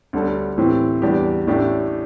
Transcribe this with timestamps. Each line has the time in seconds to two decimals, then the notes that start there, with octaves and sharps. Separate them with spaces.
0.13 D2 D3 G3 D4 A4
0.58 A2 E3 C4 G4
1.02 E2 E3 G3 D4 G4
1.47 A1 A2 A3 D4 G4